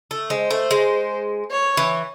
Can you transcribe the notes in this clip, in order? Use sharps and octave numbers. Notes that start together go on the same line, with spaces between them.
A3
G#3 C5
A3
G#3
C#5
E3